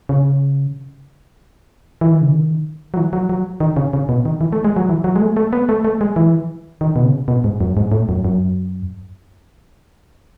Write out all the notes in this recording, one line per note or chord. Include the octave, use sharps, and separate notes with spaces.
C#3
E3
D#3
C#3
D#3
F#3
E3
F#3
F#3
D#3
C#3
C#3
B2
D#3
E3
A3
G#3
F#3
E3
F#3
G#3
A3
A3
B3
A3
A3
G#3
E3
D#3
B2
C#3
B2
G#2
F#2
G#2
A2
F#2
F#2